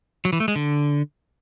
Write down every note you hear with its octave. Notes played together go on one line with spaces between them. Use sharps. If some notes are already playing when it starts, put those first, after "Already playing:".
F#3
E3
A3
G#3
D3